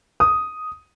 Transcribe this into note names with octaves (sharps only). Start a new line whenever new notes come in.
D#6